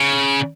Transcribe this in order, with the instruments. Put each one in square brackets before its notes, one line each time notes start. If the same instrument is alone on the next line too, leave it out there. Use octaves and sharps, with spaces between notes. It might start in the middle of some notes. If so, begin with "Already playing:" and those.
Already playing: [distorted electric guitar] C#3